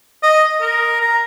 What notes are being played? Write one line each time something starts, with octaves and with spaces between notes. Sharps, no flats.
D#5
A#4
A#5